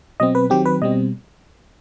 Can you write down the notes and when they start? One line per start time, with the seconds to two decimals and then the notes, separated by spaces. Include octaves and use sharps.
0.20 B2 F#3 C4 D#5
0.35 B4
0.50 D#3 F#3 C4 G4
0.65 B4
0.82 B2 G3 C4 D#5